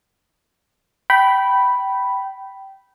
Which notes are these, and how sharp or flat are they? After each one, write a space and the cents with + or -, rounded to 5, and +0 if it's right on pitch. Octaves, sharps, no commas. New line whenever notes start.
G5 -20 B5 +0